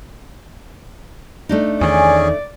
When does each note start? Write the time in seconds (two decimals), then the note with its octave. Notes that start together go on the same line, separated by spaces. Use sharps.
1.49 A3 D4 D#4
1.81 E2 D#3 C#4 G#4 D5